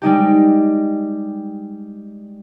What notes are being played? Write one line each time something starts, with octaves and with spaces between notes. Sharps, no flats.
G3 G#3 D#4 G4